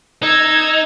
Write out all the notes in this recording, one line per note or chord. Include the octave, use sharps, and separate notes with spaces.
D#4 E6 G#6